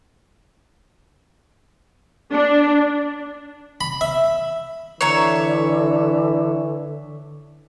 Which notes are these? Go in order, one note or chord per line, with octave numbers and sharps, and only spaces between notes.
D4
B5
E5
D3 E3 C#5 E5 A#5 C#7 F7